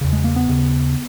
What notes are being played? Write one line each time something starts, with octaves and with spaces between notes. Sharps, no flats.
E2 C#3
G#3
A#3
B3
D#2 C#3